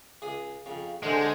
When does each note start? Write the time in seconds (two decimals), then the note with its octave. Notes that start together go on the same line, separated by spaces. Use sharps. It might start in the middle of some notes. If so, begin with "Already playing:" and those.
0.22 C#2 G#4 D#6
0.66 F2 C#3
1.03 C2 D3 G#3 G#4 A4 C5